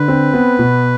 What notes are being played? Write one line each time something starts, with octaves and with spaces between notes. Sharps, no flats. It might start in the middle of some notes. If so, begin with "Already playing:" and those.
Already playing: D3 B4
C4
B3
B2